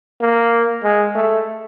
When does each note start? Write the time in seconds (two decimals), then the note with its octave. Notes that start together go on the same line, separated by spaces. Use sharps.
0.21 A#3
0.84 G#3
1.15 A3